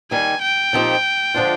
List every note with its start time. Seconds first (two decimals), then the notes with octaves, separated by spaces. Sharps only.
0.11 D#2 D#3 G3 G#5
0.42 G5
0.73 A#2 F3 C4 D#4 G4
1.34 D3 F3 G#3 D4 F4